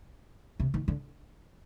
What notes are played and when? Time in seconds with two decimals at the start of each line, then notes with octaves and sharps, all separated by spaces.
0.60 C3
0.74 D#3
0.88 D3